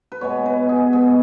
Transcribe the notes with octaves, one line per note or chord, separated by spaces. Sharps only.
B4
B2 G#3 B3 C#5
B4
G#4
B2 G#3 B3 G#4